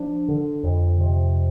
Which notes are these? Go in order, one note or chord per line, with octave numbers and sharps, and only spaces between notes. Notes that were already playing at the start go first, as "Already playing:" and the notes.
Already playing: F3 D4
D3
F2
C3